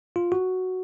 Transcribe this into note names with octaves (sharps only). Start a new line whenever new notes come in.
F4
F#4